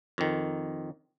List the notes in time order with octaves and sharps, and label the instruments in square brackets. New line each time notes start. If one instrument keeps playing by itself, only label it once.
[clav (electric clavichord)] F2 D#3